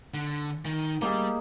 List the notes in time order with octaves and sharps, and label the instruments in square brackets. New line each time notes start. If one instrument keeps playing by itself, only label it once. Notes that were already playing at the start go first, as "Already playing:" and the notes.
[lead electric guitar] D3
D#3
[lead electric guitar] G3 [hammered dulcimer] A#3 D#4 G#4